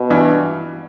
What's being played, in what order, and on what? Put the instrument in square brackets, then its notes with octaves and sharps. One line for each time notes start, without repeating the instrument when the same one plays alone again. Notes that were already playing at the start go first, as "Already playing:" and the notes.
Already playing: [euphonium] B2
[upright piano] G2 E3